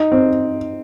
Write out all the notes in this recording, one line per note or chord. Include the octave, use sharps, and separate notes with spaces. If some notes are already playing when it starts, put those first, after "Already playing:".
Already playing: D#4
C4